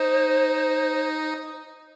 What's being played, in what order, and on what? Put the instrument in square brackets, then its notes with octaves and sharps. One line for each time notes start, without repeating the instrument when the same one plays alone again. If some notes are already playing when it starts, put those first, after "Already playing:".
Already playing: [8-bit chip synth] D#4 [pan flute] C5